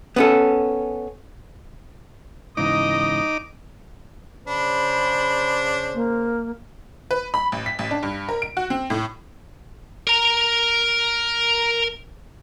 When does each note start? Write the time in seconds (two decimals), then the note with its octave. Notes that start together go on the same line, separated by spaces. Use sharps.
0.16 B3 C#4 A4
2.57 G#2 C#3 E3 D#4 D#5 D6
4.47 C#3 D4 C5 B5
5.95 A#3
7.11 B4
7.34 B5
7.52 A1
7.66 B6
7.79 A1
7.91 D4
8.03 G2
8.29 A#4
8.42 D7
8.57 F#4
8.70 C4
8.90 A2
10.07 A#4 A#5